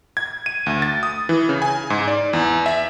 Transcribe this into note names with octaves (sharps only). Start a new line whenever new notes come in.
G#6
D#7
D2
A6
D#6
E3
C#3
G#5
G#2
D5
E2
E5